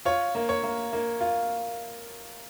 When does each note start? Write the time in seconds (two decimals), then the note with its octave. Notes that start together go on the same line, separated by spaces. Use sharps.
0.05 F4 C#5
0.35 A#3
0.49 C#5
0.63 A#3
0.93 A#3
1.21 F4